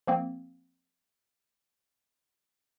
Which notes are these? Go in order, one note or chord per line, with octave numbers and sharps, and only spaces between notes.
F3 A#3 C4